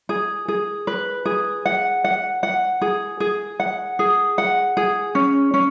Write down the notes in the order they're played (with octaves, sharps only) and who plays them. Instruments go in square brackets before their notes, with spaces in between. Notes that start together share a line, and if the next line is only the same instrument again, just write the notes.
[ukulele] G#4
G#4
B4
G#4
F#5
F#5
F#5
G#4
G#4
F#5
G#4
F#5
G#4
C#4
C#4